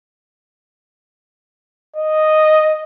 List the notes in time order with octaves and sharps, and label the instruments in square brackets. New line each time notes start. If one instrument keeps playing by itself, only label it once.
[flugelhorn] D#5